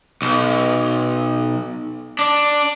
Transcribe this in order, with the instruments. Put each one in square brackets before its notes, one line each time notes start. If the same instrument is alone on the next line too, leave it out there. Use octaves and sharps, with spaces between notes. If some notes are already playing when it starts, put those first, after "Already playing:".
[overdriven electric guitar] B1
D4